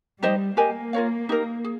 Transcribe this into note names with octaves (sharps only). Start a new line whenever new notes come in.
G3 D#4 G4 C5 D#5
A#3 G4 A#4 D#5 G#5
F4 A#4 C#5 F5
D#4 G4 A#4
G#4